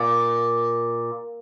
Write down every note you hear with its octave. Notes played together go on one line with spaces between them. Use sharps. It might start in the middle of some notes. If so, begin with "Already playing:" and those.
Already playing: A#2